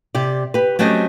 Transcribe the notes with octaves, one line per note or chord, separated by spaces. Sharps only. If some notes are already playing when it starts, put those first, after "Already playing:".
C3 G4 D5
G4 B4
F#3 A3 C4 C#4 G4 D#5